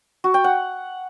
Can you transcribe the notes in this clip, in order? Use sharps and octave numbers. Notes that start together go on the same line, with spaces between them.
F#4
G5
F#5